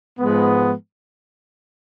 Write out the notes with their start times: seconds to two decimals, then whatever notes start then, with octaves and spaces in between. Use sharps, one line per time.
0.18 G#2 F3 G#3 B3